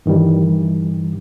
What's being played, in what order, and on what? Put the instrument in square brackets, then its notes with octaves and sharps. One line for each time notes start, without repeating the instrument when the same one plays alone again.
[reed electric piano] G2 D#3 E3 G3